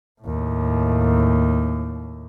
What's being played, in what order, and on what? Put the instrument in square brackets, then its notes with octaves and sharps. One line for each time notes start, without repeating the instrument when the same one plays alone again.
[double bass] D#2 A2